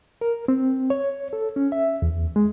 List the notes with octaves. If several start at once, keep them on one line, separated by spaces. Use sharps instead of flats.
A#4
C4
C#5
A4
C#4
E5
E2
G#3